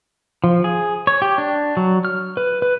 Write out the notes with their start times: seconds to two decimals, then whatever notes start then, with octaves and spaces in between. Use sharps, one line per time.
0.44 F3
0.64 G#4
1.07 C#5
1.22 G4
1.38 D4
1.77 F#3
2.05 F6
2.37 B4
2.62 B4